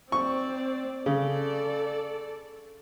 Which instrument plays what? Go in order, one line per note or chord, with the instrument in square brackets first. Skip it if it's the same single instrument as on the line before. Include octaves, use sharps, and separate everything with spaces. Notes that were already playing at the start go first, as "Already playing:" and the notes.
[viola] C4 D5 [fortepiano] C#6
[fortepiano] C#3 [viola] A4 D5